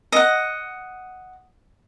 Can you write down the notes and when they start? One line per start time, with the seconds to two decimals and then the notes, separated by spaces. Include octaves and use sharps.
0.12 D#5 F#5